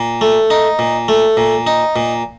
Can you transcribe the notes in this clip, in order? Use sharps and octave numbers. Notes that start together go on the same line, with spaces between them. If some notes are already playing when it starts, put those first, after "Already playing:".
Already playing: A#2
A3
D#4
A#2
A3
A#2
D#4
A#2